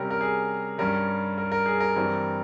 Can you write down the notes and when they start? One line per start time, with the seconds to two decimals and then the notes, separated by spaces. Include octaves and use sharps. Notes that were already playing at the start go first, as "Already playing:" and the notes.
Already playing: C3 G3 C#4 A#4
0.10 A#4
0.21 G#4
0.78 G2 G3 C#4 A#4
1.38 A#4
1.52 A#4
1.66 G#4
1.80 A#4
1.96 G2 E3 G3 C4